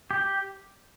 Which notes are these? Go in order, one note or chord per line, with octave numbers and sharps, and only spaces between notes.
G4